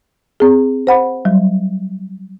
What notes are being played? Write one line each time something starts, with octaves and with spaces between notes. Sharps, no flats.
C4 G#4
C5 F#5 B5
F#3 G3